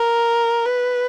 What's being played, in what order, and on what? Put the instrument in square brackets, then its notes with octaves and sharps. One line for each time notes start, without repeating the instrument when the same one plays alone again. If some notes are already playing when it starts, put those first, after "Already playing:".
Already playing: [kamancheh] A#4
B4